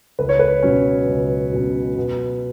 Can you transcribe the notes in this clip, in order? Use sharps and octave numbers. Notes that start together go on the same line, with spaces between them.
C#2 B4
C#5
B4
B2 F#3 C#4
C#2
B2 F#3 C#4
B2